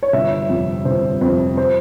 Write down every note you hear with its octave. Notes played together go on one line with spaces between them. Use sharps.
C#5
G1 E5
F2 C3
G1 C5
F2 C3 C5
C5